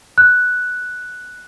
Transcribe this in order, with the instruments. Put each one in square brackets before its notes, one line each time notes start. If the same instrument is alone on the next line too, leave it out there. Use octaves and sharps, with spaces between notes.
[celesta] F#6